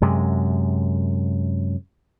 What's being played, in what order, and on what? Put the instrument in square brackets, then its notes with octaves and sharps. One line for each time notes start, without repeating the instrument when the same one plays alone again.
[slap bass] F#2 C3 G#3